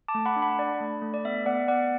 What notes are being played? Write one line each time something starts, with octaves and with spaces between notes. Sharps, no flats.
A5 D6
A3
F#5 B5
D4
F#5 B5
D4 D5
A3
A3
D5
B3 E5
B3 D5 F#5
B3 D5 F#5